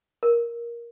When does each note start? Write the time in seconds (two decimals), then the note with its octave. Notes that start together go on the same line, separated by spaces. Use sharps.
0.23 A#4